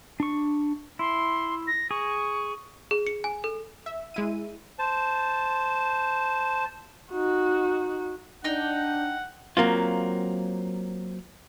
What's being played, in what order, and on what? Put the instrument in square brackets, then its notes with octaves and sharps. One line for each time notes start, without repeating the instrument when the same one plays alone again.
[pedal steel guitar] D4 C#6
[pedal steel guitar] E4 [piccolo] C6
[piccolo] A#6
[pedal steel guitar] G#4 [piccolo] C#6
[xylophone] G#4
C#7
G#5
A4
[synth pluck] E5
G#3 E4 D#7
[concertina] C5 A5
[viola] D#4 F#4
[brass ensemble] D4 [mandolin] D#4 G5 [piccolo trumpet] F#5
[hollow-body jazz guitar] F#3 A#3 C4 F4